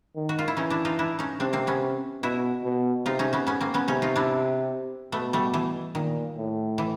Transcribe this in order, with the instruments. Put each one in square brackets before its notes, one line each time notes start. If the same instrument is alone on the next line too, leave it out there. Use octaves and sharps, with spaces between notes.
[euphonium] D#3
[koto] F#4
F4
E4
[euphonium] E3 [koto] C#4 D#4
[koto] D4 E4
D#4 F4
D4 E4
C#4 D#4
[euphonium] C3 [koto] C4 D4
[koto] A#3 C4
B3 C#4
[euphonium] B2 [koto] E4 F#4
[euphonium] B2
[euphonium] C3 [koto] D#4 F4
[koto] C#4 D#4
B3 C#4
B3 C#4
A#3 C4
B3 C#4
[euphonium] C3 [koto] C#4 D#4
[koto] D#4 F4
D4 E4
[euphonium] B2 [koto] A3 B3
[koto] G3 A3
E3
[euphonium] A#2 [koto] D#3
[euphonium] A2
[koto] E3